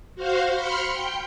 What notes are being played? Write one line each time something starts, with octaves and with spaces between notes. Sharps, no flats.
F#4 C5 F5
B5 C6 F6 C#7
G5 G6